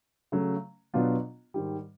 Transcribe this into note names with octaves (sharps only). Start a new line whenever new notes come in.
C#3 F#3 A3
B2 F#3 B3 D4 F4
G#2 D#3 G3